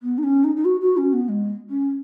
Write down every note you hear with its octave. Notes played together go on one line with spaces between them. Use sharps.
B3
D#4
C#4
D#4
D#4
F#4
F#4
C#4
B3
G#3
C#4